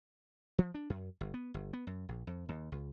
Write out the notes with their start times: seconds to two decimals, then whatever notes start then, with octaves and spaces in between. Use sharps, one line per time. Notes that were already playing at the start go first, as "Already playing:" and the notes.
0.58 F3
0.74 D4
0.90 F#2
1.21 G1
1.34 B3
1.54 G1
1.73 B3
1.87 F#2
2.09 A#1
2.27 F2
2.49 D#2
2.72 C#2